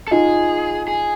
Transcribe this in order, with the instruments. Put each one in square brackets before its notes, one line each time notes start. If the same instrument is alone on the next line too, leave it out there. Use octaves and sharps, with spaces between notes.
[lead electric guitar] A4
[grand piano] D#4 F4 [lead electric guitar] G#4
[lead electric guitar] G#4